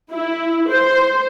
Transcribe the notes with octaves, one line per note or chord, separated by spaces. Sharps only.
E4
C5